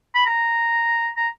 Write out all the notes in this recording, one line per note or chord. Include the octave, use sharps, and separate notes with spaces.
B5
A#5
A#5